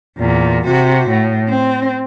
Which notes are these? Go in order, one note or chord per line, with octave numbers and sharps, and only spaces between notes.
E2 A#2
C3 F#4
A2
C4